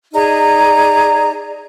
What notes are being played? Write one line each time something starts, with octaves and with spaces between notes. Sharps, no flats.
D#4 G#4 D5 A#5